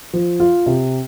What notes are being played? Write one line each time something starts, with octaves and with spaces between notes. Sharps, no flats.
F3
F4
C3